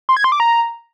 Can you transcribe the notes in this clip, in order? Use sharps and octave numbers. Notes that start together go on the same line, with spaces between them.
C6
G#6
C6
D6
A#5